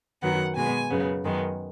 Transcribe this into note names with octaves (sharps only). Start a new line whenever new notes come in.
F#2 D#3 F#3 B3 F#5
B2 G#3 B3 G#5
F#2 C#3 B3
F#2 D#3 G#3 B3